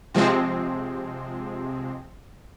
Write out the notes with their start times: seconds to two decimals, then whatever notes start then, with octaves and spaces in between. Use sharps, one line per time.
0.15 C3 F3 G#3 C4